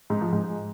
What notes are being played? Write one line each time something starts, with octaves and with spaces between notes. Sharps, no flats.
G#2
F3
G#2